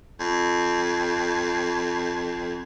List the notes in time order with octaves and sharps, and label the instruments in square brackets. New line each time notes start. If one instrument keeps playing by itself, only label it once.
[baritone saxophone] F2